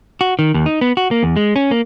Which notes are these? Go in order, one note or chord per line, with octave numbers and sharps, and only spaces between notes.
F#4
D#3
D#2
D#4
B3
F#4
A#3
E2
G#3
C#4
A#3